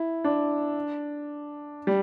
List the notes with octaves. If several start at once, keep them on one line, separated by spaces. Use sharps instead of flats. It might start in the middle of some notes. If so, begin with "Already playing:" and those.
Already playing: E4
D4
G3